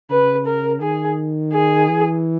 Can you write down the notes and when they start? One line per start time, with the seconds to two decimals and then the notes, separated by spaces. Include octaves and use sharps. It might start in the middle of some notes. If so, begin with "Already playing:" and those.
0.10 C#3 B4
0.46 A#4
0.81 D#3 G#4
1.53 G#4
1.89 E3